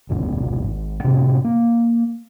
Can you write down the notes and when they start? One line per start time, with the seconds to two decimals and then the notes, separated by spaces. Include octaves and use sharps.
0.09 G#1 D2 G#2 B2
0.63 G#1
1.04 A2 C3 B3 C#4
1.45 A#3